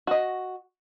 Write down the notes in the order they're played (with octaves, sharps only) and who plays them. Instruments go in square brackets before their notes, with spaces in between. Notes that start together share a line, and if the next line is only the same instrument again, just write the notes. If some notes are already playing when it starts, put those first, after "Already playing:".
[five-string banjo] F#4 D#5